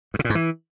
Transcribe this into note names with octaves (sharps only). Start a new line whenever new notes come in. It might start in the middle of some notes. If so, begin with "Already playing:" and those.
G2
C#3
A#2
G#2
E3